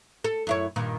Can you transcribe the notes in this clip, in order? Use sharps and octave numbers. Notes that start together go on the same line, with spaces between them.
A4
F#2 E4 C#5
G2 A#2 D#3